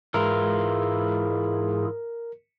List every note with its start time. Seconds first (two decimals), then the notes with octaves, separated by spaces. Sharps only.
0.14 G#2 E3 E4 F4 G#4 A#4